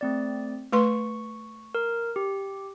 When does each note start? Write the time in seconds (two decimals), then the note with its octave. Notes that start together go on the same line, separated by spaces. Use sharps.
0.01 A3 C4 D5
0.72 A3 B4 C6 C#6
1.75 A#4
2.16 G4